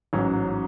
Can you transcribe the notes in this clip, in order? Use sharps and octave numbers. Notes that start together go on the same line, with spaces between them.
A1 G#2 F#3 C#4